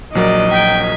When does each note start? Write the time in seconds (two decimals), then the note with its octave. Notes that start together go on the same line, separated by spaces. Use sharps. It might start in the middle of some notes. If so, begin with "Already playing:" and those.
0.15 A#1 F#3 A#4 D5 D#5
0.51 G5 G#6 B6